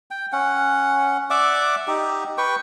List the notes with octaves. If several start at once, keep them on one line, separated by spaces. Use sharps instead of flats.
G5
C#4 F#5
D5 E5 F#5 D6
D#4 G4
B4 G5 C#6